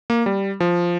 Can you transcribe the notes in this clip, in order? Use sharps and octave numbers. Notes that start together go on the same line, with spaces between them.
A#3
G3
F3